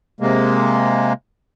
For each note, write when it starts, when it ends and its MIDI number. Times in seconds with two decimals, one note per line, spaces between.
0.20 1.13 48
0.20 1.13 56
0.20 1.13 58